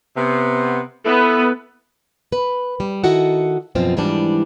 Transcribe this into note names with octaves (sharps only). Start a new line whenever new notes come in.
C3 B3
B3 E4 A4 B4
B4
G3
D#3 E4 F#4 A4 D#5 F#5
F#2 B2 F3 C4 F4
G#2 E3 F3 G3 D4